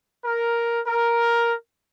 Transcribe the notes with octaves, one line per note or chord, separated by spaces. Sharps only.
A#4
A#4